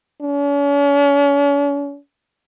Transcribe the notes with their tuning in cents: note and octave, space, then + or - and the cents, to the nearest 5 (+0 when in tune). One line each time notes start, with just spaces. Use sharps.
C#4 +40